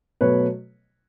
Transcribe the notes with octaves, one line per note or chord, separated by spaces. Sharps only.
B2 F#3 A3 B4 C#5